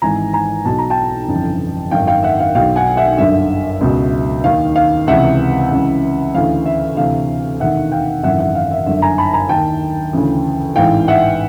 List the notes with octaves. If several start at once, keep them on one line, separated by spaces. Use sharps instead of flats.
G#1 G#2 E3 G#5 A#5
G#5 A#5
B1 B2 A5
A#5
G5 A5
G1 F2 C#3 E3
G#1 F#2 D#3 F5 G5
F5 G5
E5 F#5
F5
B1 B2 F5 G5
F#5 G#5
E5 F#5
G1 F#2 D3 E5
C#2 B2
D#2 D#3 F5
F5
C#2 C3 E3 E5 F#5
C#2 C#3 E3
D2 C#3 E3 F5
E5
D2 C3 E3 F5
E1 D#2 D#3 E5 F#5
F5 G5
G#1 F#2 C#3 E3 E5 F#5
E5 F#5
F5
E5
G1 F#2 D3 E5
G#5 A#5
A5 B5
G#5 A#5
D#2 D#3 G5 A5
D2 C#3 E3
A1 G#2 E3 F5 G5
E5 F#5